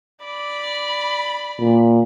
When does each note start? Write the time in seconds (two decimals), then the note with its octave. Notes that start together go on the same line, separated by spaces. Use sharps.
0.25 D5 B5
1.59 A#2